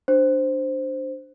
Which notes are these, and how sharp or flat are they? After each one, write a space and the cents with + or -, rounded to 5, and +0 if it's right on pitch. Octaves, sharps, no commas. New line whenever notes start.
D4 +5 C5 +0